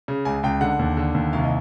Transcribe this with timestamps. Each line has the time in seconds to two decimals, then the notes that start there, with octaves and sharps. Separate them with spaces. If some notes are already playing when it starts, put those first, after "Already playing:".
0.08 C#3
0.25 C#2 G#5
0.43 C#2 G5
0.61 D3 F#5
0.79 D#2
0.97 D3
1.14 D#2
1.33 C2 F5
1.44 D#5